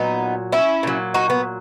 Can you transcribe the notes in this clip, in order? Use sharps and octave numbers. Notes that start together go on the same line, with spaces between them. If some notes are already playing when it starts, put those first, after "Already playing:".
Already playing: A#2 F#3 B3 D#4
C#4 E4
A#2 F#3
D#4 F#4
B3